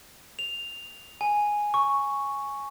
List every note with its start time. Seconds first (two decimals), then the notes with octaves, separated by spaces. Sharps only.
0.39 F7
1.21 G#5
1.74 C#6